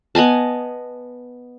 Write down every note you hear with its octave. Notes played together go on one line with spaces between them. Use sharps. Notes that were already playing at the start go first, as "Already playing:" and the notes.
B3 D#5 G#5 A5